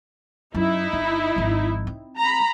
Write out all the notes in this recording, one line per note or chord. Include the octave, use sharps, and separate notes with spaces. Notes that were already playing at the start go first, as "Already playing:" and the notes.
F#2 D#4 E4
G1
G#1 F3
C4
A#5 B5